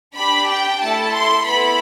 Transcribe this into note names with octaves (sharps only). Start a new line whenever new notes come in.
D4 G4 B5
G5
A3 E4 A4 A5
C6
B3 E4 A4 B5